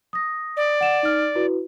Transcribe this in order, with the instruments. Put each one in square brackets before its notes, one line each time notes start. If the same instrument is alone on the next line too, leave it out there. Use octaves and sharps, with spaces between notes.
[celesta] D#6 A#6
[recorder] D5
[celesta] F#5 E7
D#4 F6
E4 F#4 B4